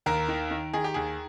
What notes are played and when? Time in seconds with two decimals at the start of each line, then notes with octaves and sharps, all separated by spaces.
0.06 D#2 A#4
0.29 D#3
0.51 D#3
0.74 D#3 G#4
0.84 G4
0.94 D#2 G#4